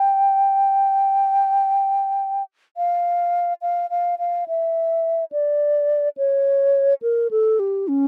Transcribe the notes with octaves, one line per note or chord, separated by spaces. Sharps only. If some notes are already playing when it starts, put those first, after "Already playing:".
Already playing: G5
F5
F5
F5
F5
E5
D5
C#5
A#4
A4
G4
C#4